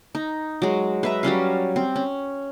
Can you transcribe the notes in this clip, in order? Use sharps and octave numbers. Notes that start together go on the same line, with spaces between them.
D#4
F#3 G#3
B4 E5 A#5
F#3 G3 C#4 F5
C4
C#4